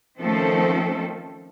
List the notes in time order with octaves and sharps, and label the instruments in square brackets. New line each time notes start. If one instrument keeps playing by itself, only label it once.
[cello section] D#3 F3 A3 C4 C#4 A4